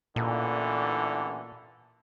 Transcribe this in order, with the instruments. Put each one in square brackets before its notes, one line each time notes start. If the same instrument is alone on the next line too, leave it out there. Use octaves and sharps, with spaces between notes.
[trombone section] A1 D3 E3 [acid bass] A#2